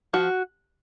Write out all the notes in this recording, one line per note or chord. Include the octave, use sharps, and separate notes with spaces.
F3 F#4